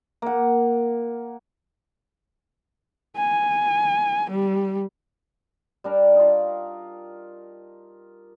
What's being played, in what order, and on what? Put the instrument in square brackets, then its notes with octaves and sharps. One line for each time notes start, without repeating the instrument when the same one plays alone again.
[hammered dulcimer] A#3 F#5
[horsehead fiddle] G#5
G3
[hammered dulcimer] G3 D4 A#4
D#4 F4